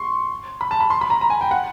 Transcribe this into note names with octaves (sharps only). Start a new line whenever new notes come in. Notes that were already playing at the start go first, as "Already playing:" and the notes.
Already playing: C6 C#6
B5
A5
B5
C6
B5
A#5
A#5
G#5
G5
F#5